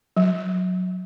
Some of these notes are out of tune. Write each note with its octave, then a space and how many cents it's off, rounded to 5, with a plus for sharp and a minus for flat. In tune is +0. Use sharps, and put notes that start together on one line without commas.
F#3 -15